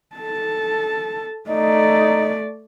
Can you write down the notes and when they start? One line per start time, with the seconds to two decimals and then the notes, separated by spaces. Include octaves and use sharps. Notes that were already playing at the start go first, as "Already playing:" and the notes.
0.16 A4 A5
1.50 A3 D#4 D5